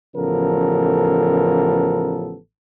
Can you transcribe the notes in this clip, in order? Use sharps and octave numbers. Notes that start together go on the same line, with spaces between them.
A1 C#3 F3 B3 A4 A#4